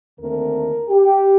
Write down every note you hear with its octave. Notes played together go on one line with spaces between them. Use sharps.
D#2 D3 A3 C4 A#4
G4